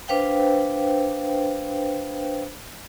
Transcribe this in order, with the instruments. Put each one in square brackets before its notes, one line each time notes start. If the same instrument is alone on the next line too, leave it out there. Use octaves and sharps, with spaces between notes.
[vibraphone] D4 B4 C5 F5 G5